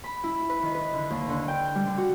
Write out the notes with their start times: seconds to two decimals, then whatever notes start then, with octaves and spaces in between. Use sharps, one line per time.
0.04 B5
0.24 E4
0.49 B4
0.62 D#3
0.75 B4
0.93 D3
1.11 D#2
1.29 D3
1.48 G5
1.75 G3
1.87 D3
1.98 F#4